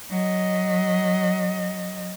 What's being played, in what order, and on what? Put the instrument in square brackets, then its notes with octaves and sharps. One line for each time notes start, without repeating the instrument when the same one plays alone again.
[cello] F#3 D#5